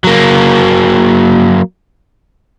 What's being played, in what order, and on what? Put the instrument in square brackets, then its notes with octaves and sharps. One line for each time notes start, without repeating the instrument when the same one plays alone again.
[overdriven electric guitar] F#3 A#3